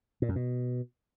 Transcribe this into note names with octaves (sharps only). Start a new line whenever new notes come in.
A#2
F#2
B2